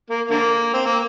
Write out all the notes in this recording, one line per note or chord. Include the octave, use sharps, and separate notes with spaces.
A#3
D3 A#3
C4
A#3